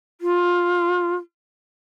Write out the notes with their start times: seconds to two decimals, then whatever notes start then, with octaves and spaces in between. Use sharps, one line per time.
0.21 F4